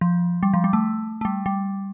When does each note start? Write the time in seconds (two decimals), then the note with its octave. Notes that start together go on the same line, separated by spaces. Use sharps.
0.01 F3
0.43 G3
0.54 F3
0.64 G3
0.73 A3
1.21 A3
1.25 G3
1.46 G3